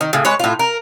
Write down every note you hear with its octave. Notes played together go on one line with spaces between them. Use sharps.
D#3
A2 C#3
G#3 B4 C#5
A2 F4
A#4